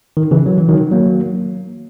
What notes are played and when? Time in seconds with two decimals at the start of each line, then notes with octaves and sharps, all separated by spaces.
0.17 D#3
0.31 C#3 E3
0.46 F#3
0.57 E3
0.69 D#3 F#3
0.92 F#3 A#3